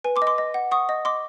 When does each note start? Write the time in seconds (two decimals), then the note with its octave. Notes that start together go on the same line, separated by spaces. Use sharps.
0.04 B4 G#5
0.16 C6 D6
0.22 D#5
0.27 C6 D6
0.38 D#5
0.54 F#5
0.71 F#5 C#6 D#6
0.89 D#5
1.05 D#5 C6 D6